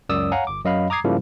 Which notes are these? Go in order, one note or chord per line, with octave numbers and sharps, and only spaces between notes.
C#2 F#2 D5 D#6 E6
C#5 F5 F#5 G#5 A#5
G1 D6
F#2 F#3 D#5 F5 B5
A#5 D6 D#6 G#6 C7
G#2 C#3 F3 G3 A#3 E4